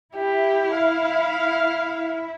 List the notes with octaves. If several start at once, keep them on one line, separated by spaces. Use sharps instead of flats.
E4 G4
F5